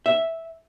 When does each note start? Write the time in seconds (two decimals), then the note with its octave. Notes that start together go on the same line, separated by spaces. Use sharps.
0.06 E5